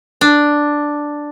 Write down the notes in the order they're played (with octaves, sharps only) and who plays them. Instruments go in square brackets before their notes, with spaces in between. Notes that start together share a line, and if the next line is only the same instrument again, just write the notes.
[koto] D4